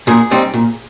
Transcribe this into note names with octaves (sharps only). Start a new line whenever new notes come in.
A#2 G#4
G3 C4 D#4
A#2